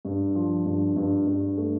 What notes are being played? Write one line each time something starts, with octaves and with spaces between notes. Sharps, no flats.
G2
F3
G2
G2
G2
A3